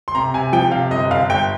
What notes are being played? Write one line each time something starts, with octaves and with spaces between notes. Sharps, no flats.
C6
C3 A#5
C3 G#5
F3 G5
C3 F5
G1 D#5
G1 F5
G1 G5